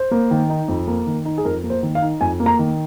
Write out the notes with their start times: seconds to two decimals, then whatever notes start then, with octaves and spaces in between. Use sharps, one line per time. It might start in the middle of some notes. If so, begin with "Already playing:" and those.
Already playing: C5
0.11 A#3
0.31 D#3
0.50 D#4
0.68 F2
0.87 A#3
1.07 D#3
1.25 D#4
1.38 G#4
1.45 F2 A#4
1.64 A#3
1.70 C5
1.83 D#3
1.95 F5
2.02 D#4
2.21 F2 G#5
2.40 A#3
2.46 A#5
2.59 D#3